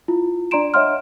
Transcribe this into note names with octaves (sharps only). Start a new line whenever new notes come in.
E4 F4
D4 D5 A#5 C6 D7 E7
C#5 D#5 E5 F#5 C6 F6